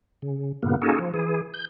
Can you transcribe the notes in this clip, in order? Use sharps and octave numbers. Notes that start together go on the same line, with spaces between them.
C#3
G2 A#2 C#3 A#3 B3
A#3 C#4 D#4 F#4 G#4 A4
F3
E3 G#4
G6